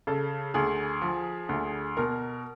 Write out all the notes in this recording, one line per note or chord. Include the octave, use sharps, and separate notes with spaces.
C#3 A4
D2 G#4
F3
D2
B2 A#4